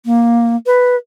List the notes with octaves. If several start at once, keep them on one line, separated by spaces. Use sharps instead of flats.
A#3
B4